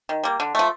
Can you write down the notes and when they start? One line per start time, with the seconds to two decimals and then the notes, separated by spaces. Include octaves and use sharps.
0.09 D#3
0.24 G3 A#3
0.40 D3
0.55 F3 A3